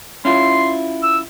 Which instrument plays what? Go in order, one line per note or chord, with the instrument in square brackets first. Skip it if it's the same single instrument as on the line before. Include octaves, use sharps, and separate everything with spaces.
[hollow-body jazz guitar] C#4 E4 F4 [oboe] C6
[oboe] E6